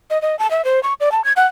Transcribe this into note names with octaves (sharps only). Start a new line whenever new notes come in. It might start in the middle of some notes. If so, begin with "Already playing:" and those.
D#5
D#5
A5
E5
C5
C#6
D5
A5
G#6
F#5